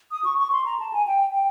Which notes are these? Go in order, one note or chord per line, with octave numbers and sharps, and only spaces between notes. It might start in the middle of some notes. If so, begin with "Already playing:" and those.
D#6
C#6
C#6
C6
A#5
A5
G#5
G5
G5